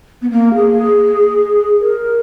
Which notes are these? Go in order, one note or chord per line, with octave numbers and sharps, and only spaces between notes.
B3
A#3
G#4
A#4